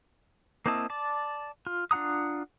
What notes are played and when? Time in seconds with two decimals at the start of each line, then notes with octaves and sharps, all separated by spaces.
0.66 A#3 C4 E4 D#5 A5
0.90 D5 A5
1.67 F4
1.91 D4 F4 F#5 A#5 D#6